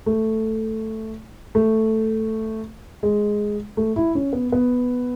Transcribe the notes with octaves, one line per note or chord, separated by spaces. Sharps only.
A3
A3
G#3
A3
E4
C#4
B3
B3